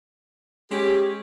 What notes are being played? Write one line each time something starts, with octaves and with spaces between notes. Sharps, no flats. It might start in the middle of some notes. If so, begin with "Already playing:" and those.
G#3 C#4 G4